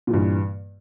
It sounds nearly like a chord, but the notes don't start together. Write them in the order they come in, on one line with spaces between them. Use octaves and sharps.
A#2 E3 G2